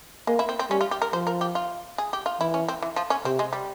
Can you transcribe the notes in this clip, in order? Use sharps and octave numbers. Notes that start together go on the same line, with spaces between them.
G#3 A#3
E4
C4
C4
G3 C#4
F4
G4
A#4
F3 C5
A#4
G4
F4
G#4
G4
F4
E3 E4
C#4
C4
E3
F3
C#4
C3 C4
G#3
G3